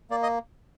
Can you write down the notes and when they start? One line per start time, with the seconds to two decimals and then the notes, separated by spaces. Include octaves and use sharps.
0.10 A#3 D5
0.23 D#5